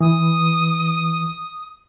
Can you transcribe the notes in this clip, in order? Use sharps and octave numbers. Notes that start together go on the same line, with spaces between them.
E3 D#6